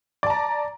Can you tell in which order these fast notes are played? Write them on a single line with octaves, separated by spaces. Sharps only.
D5 A5 A#5